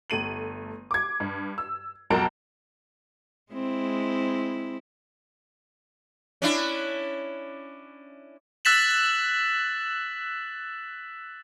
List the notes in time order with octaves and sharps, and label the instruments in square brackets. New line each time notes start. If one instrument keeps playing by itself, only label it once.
[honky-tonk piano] G1 A3 D#7 F#7
D6 G#6
G2
E6
B1 F2 F#3 A#4 A5 D7
[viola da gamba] G#3 C4 E4
[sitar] C#4 D4 E4
[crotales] E6 F#6 A6 B6 E7 F#7